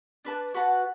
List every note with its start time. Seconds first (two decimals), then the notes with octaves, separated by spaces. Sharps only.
0.25 D4 B4 D5 A5
0.54 F#4 B4 F#5 A5